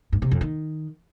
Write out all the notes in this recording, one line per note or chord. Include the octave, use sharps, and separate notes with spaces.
G2
C3
F2
D#3